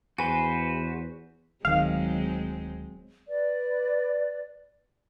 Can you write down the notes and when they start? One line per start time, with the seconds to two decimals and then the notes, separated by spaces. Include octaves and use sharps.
0.18 E2 F#4 B4 C5 G#5
1.65 D1 D#3 F#3 G#3 C4 F5
3.28 B4 D5